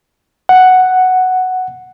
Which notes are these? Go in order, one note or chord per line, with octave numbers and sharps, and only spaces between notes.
F#5